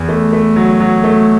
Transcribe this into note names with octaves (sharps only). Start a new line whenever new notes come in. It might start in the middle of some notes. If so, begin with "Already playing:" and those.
Already playing: E2
A3
A3
F#3
F#3
A3